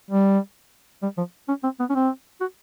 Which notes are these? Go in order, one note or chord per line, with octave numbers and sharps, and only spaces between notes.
G3
G3
F3
C#4
C4
B3
C#4
C4
F#4